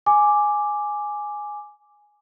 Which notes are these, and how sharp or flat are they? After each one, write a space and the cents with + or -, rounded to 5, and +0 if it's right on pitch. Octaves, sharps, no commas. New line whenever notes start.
G#5 +0 D6 +0